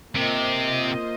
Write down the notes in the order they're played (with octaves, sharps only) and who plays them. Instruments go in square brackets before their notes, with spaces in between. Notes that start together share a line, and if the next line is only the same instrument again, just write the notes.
[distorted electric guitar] C3 [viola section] A#3 F4 C5 D#5